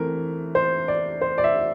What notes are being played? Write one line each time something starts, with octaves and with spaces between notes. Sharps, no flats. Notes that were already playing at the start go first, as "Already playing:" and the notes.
Already playing: E3 A3 C4 A#4
C5
D5
C5
D5
E5